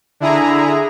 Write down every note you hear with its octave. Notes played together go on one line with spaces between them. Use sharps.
D3 E4 G#4 A#5